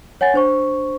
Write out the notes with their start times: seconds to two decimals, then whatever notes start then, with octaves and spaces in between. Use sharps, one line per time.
0.21 C#5 F#5 G#5 A6
0.34 D4 C5 C#6